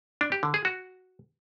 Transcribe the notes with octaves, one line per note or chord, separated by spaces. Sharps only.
D4
G4
D3
G#4
F#4